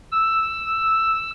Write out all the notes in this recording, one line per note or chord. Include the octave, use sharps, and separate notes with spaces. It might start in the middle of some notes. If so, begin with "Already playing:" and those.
E6